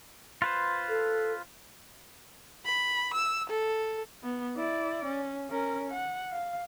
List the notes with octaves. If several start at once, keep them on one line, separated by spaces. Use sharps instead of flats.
F4 B4 C5
A4
B5
E6
A4
B3
E4 D5
C#4
C#4 A#4
F#5
F5